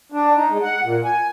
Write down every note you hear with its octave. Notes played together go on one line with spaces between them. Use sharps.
D4
D#4
G#3
F#5
A#2
G#5